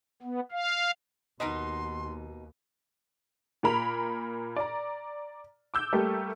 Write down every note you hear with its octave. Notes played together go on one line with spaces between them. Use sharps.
B3
F5
D#2 B2 D#4 A#4 B4 D#5 C6
A#2 A#4 B5 F7
D5 A#5
D6 E6 G6
G3 A3 A#3 G4 A4